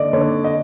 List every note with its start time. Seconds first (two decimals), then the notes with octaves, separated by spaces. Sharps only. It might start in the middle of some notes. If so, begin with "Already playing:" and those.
Already playing: D3 D5 D#5
0.13 D3 C#5
0.44 D#5